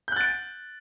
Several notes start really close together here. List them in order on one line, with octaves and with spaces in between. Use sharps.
G6 F#6 A6 D7